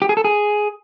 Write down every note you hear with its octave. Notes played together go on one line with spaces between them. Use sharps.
G4
G#4
A4
G#4